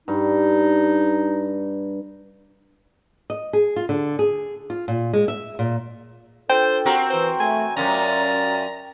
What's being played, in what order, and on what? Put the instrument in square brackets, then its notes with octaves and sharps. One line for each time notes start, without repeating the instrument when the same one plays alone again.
[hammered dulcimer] G2 [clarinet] D#4
[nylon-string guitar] D#5
G#4
F4
D3
G#4
F4
A#2
G#3
E5
A#2
[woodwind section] D4 F4 A4 [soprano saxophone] C5 [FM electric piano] G5
[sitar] C4 F#4 A#4 [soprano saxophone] G4
[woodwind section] E3 [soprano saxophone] C5
[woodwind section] A3 [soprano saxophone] G#5
[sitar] F#2 B2 C#4 [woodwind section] F4 A#4 D5 [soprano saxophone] A#5